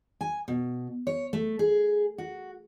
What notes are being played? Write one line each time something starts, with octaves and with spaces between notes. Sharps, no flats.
G#5
B2
C#5
A3
G#4
F#4